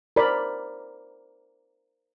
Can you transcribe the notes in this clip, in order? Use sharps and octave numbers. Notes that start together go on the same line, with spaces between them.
A#4 C5 D5 B5